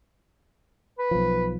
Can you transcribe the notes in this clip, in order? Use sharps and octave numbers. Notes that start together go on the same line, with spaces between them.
B4
B1 F3